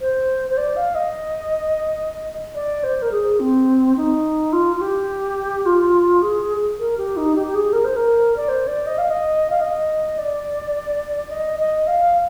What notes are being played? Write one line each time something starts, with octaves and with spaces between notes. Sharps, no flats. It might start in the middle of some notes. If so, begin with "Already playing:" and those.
C5
C5
D5
F5
D#5
D5
C5
A#4
G#4
C4
D#4
F4
F4
G4
F4
G#4
A#4
G4
D#4
G4
G4
G#4
A#4
C5
A#4
D5
C5
D5
D#5
F5
D#5
F5
D#5
D5
D#5
D#5
F5